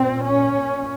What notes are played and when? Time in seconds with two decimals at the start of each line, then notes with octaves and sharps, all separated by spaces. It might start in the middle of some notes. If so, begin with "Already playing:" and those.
Already playing: A#2 C4
0.23 C#4
0.53 A#2